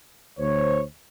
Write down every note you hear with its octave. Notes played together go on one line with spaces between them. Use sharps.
D2 C5 C#5